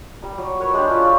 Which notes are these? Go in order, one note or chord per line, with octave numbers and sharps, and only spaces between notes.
G3 A#5
F#3
A#4 B4 C#5
G#3 D4 G4
C#4 D4 F4 E6
C#4 B4 F5